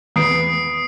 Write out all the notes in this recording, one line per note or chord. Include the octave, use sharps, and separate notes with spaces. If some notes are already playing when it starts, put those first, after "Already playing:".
E2 B3 B4 D#6 C7 D7